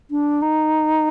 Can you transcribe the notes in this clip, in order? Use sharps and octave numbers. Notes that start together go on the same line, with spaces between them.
D4
D#4